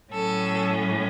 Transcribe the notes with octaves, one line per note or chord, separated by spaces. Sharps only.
A2 F#3 C#4 A4